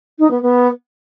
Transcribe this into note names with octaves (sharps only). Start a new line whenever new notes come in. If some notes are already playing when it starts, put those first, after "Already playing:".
D#4
B3
B3